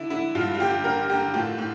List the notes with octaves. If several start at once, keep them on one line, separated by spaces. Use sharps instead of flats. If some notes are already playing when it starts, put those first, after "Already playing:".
Already playing: D3 E4
D3 E4
G2 F4
F4
D3 G4
D3 A#4
D3 G4
A2 F4
A2